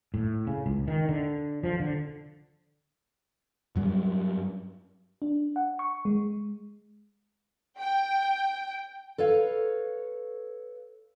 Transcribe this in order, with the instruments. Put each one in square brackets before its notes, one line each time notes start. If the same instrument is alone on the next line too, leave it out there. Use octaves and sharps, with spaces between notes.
[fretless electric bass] A2
C#3
C#2
D#3
D3
F3
D3
[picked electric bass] G2 F#3 G3
[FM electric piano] D4
F#5
C#6
G#3
[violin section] G5
[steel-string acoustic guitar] A4 B4 C#5 F5